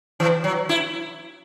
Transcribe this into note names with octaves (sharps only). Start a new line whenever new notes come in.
E3
F#3
E4